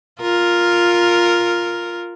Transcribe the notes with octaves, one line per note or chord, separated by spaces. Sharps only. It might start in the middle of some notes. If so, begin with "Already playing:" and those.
F4 A#4